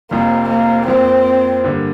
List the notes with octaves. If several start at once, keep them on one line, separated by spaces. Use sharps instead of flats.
F1 F2 F3 A#3
A#3
F2 F3 A#3 C4
G2 D3 A#3